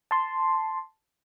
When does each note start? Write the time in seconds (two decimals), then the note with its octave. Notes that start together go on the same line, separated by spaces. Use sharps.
0.11 A5 C6